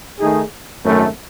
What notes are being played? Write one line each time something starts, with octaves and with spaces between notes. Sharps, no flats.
D#3 A3 D#4 G#4
G#1 F#2 D#3 A3